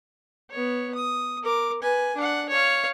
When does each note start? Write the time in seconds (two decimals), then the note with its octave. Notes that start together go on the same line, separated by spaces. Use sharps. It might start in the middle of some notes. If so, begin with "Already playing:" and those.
0.51 B3 C#5
0.95 D#6
1.43 A#4 D6
1.82 B4 G#5
2.16 D4 F#5
2.49 C#5 F5